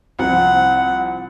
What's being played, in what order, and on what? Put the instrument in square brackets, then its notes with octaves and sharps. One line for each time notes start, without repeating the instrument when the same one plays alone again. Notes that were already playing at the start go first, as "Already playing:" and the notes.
[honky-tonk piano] C2 F3 [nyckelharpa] F#5